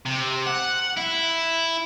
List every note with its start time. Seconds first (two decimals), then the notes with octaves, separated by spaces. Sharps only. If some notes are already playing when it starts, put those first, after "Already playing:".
0.06 C3
0.47 F#5
0.97 E4